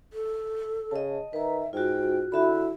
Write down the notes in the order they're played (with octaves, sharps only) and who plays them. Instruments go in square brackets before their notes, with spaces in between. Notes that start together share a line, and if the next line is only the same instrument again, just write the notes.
[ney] A4
[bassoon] C#3 [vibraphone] D#5 A5
[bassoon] D#3 [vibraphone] B4 A#5 [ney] E5
[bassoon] G#2 [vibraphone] F4 F#4 [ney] G5
[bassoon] D3 [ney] E4 [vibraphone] F#4 E5 B5